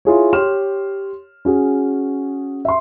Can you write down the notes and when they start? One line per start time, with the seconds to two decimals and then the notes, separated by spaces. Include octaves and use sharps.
0.05 E4 F4 G#4 C#5
0.33 G4 C#5 C6 F6 E7
1.45 C#4 F#4 G#4
2.65 E5 C6